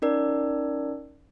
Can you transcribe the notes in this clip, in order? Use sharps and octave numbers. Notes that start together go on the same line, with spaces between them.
C#4 D#4 A#4 D5